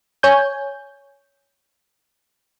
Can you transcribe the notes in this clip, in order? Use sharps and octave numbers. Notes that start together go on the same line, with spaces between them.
C#5 G#5 G6